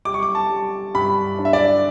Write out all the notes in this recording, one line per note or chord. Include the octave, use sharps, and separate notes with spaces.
G3 D6
C#6
D6
A5
G3
G2 B5
D4
E5
D5